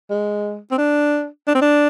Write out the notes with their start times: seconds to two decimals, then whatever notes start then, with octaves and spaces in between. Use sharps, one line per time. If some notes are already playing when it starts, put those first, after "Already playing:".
0.10 G#3
0.71 C4
0.78 D4
1.47 D4
1.55 C4
1.61 D4